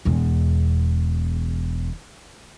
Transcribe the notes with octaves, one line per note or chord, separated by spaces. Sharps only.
E1 E2